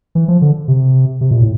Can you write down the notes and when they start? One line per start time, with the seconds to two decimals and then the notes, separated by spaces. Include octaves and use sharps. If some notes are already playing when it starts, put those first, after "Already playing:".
0.15 E3
0.28 F3
0.42 D3
0.68 C3
1.21 C3
1.31 A#2
1.41 A2